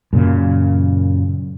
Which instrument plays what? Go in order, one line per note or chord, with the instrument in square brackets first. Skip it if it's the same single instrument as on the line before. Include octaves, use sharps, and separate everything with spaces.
[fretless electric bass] F#2 A#2 C#3